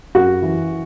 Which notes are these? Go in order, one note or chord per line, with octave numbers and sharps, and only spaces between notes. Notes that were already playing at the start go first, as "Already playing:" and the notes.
F#2 F#4
E3